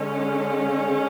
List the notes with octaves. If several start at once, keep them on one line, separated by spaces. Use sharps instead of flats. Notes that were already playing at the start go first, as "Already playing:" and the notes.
Already playing: D3 G#3 C#4